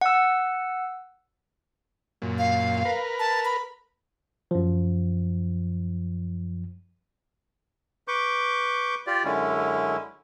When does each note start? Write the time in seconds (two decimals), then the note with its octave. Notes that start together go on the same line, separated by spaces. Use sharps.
0.01 F#5 E6
2.22 F#2 A#2
2.38 F5
2.85 A#4 B4
3.20 A5
3.45 B5
4.51 F#2 F3
8.08 B4 C#6 D6 G6
9.07 F4 G4 D5
9.24 F#2 D3 G#3 C#4 E4